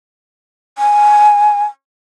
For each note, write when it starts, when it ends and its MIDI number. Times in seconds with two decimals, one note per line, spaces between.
0.78 1.63 80